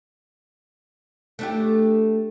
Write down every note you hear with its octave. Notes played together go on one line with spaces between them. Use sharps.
A3 D4 G4